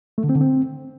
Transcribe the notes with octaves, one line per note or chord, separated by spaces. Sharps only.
A3
D3
C4
D3
C4